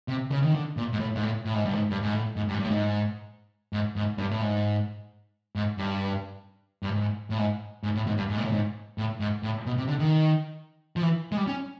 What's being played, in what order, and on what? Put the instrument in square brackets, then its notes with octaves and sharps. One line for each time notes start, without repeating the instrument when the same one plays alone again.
[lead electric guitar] C3
C#3
D#3
D3
A#2
G#2
A2
G#2
A2
A2
G#2
G2
G#2
G2
G#2
A2
G#2
G2
G#2
G2
A2
G#2
G#2
G#2
G2
A2
G#2
G#2
G2
G2
G#2
A2
G#2
G#2
A2
G#2
G2
G#2
A#2
A2
G#2
A2
G#2
A2
B2
C3
D3
D#3
F3
E3
G#3
G3
C#4